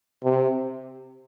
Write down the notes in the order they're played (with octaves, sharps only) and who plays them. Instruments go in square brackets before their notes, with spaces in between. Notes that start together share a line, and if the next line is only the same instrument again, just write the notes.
[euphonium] C3